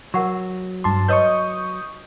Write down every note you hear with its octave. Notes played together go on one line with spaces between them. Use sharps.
F#3 A#4 F#5 C#6
G2 A5 C6 D6
B4 C#5 D#5 C#6 D#6 G6